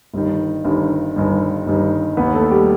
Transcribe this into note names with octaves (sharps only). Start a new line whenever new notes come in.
G1 G2 D#3
G1 G2 D#3
G1 G2 D#3
G1 G2 D#3
D#2 D#3 B3 B4
A3 A4
G3 G4